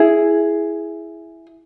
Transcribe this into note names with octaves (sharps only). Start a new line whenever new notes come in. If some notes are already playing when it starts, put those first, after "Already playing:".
Already playing: E4 G#4